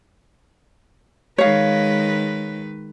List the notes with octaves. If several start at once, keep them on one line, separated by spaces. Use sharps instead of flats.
D#3 G#3 B4 C#5 F5